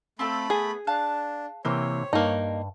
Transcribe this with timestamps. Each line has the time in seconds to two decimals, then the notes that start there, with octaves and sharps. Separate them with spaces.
0.19 A3 C4 F4 A4 B5
0.50 B3 G#4
0.87 D4 F5 A5 F#6
1.65 C3 E3 A#3 G4 C5 C#5
2.13 G2 A#3 D#4